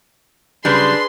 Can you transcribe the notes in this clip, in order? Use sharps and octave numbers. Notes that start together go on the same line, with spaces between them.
C#3 F#3 G3 D4 G#4 B4 C6